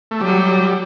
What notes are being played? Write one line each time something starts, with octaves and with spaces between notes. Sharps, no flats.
A3
F#3 G3 F#4